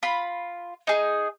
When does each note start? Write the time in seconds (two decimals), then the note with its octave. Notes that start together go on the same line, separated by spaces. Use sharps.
0.03 F4 B5
0.87 D#4 G#4